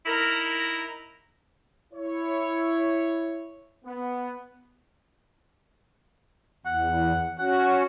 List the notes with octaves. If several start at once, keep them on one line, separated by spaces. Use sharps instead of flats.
D#4 E4 A#4
E4 C#5
B3
E2 F#5
C#4 F#4 F#5